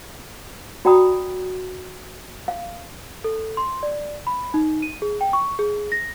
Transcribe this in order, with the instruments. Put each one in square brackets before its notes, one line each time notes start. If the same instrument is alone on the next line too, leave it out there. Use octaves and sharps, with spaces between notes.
[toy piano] F#4 D5 G5 A#5 B5 D#6
F5
[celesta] A4
C6
D5
B5
D#4
D#7
G#4
G5
C#6
G#4
A#6